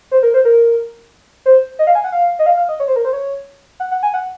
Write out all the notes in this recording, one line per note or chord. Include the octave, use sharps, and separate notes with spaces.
C5
A#4
C5
A#4
C5
D#5
F5
G#5
F#5
F5
D#5
F5
F5
D#5
C#5
C5
A#4
C5
C#5
F#5
F#5
G#5
F#5